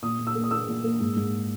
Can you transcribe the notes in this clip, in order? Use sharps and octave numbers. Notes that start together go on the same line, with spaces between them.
A#2 D#6
A#2
E6
A#3
D#6
A#3 E6
A#2
A#3
G#2
G#2